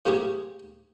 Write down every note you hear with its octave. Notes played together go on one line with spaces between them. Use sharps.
A2 C3 A#3 F4 G4 G#4